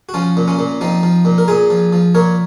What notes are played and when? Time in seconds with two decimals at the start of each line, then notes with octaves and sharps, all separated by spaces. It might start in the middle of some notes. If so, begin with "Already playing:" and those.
0.09 F#4
0.14 F3 C#4 F4
0.37 A#2
0.48 C#4 F4
0.59 A#2
0.81 F3 C4 D#4
1.03 F3
1.25 A#2
1.38 A#4
1.48 A#2 F4 G#4
1.70 F3
1.93 F3
2.15 A#2 A#4 C#5